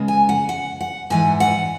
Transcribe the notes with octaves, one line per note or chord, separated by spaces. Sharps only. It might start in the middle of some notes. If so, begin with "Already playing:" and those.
Already playing: C#3 G#3 B3
G#5
F#5
F#5
F#5
G#2 E3 B3 G#5
F#5